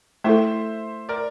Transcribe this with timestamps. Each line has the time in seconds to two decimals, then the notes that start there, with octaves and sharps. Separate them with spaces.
0.24 A3 E4 A4 C5 E5
1.09 A#4 D5